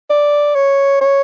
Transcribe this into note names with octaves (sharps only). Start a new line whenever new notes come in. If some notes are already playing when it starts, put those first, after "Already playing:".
D5
C#5
C#5